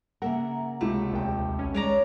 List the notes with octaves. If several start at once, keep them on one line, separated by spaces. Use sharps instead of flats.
C#3 A#3 A#4 E5 F#5 A#5
C#2 C3 A3
A#1 D#2 G5
B1 C#4
D#3 G#3 C#5 D5 A#5